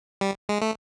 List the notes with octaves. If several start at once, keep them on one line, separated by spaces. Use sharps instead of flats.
G3
G#3
A3